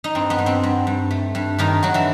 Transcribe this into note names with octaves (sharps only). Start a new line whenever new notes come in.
D#4
G2 C4
B3
G2
C4
G2
G2
A3
G2
G2 D#3 D#4
G2 F#3 F#4
E3 E4